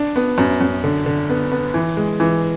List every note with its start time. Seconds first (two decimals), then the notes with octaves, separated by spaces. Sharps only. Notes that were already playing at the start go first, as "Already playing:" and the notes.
Already playing: D4
0.16 B3
0.38 F#2
0.61 F#2
0.84 D3
1.06 D3
1.30 B3
1.52 B3
1.74 E3
1.97 G#3
2.20 E3